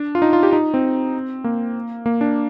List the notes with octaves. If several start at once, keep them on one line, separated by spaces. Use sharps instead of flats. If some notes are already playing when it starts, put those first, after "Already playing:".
Already playing: D4
F4
D#4
F4
G4
D#4
C4
A#3
A#3
D4